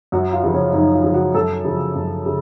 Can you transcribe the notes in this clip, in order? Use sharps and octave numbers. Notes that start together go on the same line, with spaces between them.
F#2 F#4
F4
C#3 F3
C#4
F#2 D#4
F4
C#3 F3
F#4
F#2 A4
C#3 F3
F#2
C#3